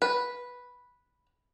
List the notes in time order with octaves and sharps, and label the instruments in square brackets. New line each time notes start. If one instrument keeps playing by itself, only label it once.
[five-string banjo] B4